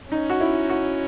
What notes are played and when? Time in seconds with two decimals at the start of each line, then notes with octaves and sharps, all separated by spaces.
0.11 C#4 D#4
0.30 F#4
0.41 E4
0.70 F#4